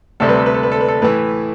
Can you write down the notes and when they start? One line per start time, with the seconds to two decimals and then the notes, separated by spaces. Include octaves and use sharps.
0.20 D2 C3 G3 A4
0.29 B4
0.37 A4
0.46 B4
0.54 A4
0.63 B4
0.72 A4
0.81 B4
0.88 A4
1.02 A2 E3 B4